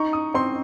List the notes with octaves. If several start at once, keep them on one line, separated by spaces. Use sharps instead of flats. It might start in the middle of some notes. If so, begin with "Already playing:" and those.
Already playing: D#4 C#6
D#6
C4 C6